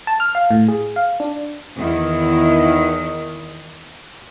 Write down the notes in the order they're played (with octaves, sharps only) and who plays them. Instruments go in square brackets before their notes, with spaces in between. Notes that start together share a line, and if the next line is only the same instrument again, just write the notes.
[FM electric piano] A5
F6
F5
A2
G#4
F5
D4
[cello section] E2 D#3 E4